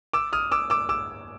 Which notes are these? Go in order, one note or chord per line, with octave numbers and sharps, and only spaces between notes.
D6 E6
D#6 F6
D6 E6
D6 E6
D6 E6